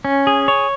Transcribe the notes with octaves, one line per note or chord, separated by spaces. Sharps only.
C#4
G#4
C#5